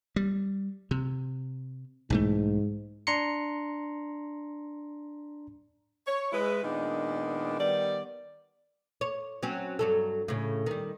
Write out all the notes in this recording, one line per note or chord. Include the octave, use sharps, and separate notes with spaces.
G3
C3
B1 G#2 E3 A3
D4 A#5 C6 C#7
C#5
G#3 E4 B4
A#2 D#3 G#3 B3 D4 D#4
D#3 G3 B3 D5
C#5
F#3 C4 C#4
G2 F#3 A4
A2 C#3
D#3 G3